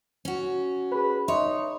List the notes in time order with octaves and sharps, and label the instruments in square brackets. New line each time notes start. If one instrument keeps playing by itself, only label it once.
[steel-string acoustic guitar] C#4 F#4
[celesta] G#4 B5 [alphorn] B4
[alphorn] D#4 [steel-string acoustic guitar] C#5 [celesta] E5 C6